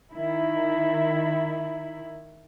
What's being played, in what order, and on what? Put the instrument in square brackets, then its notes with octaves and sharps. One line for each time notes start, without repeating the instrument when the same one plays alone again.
[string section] D#3 E4